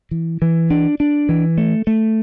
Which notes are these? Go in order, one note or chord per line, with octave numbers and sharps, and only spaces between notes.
E3
E3
D4
D4
E3
A3
A3